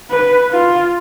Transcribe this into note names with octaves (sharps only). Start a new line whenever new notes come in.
B4
F4